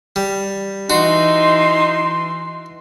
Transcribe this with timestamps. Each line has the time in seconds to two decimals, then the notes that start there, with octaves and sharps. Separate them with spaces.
0.16 G3
0.90 E3 D#4 F#4 C6